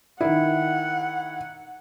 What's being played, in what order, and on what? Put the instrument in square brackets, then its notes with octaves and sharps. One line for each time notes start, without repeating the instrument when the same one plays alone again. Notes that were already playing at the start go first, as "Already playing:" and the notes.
[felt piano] D#3 E4 [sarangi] F#5